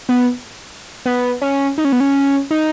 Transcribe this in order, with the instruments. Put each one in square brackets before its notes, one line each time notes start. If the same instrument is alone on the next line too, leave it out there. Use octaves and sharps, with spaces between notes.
[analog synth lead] B3
B3
C#4
D#4
C#4
B3
C#4
D#4